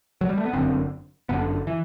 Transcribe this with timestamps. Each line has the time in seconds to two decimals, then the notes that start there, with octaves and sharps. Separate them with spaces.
0.21 F#3
0.29 G3
0.38 A3
0.45 B3
0.53 G1 F#2 D3 C4
1.29 G1 F#2 D3 B3
1.67 E3